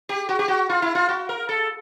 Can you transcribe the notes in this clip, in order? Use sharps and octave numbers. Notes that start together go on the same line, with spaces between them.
G4
F#4
G4
F#4
F4
E4
F4
F#4
A#4
A4